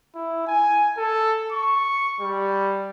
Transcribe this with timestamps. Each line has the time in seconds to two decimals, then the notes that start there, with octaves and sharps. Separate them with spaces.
0.15 E4
0.47 G#5
0.97 A4
1.52 C#6
2.20 G3